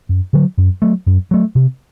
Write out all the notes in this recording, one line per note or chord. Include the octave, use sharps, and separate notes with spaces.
F#2
D3 F#3
F#2
F#3 A3
F#2
F#3 A3
C3